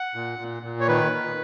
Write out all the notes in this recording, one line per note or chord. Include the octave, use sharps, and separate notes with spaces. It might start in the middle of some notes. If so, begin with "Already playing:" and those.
Already playing: F#5
A#2
A#2
A#2
C#5
D#3 B4
D#3